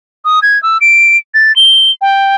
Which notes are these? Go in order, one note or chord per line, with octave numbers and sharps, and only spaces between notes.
D#6
G#6
E6
D7
A6
G7
G5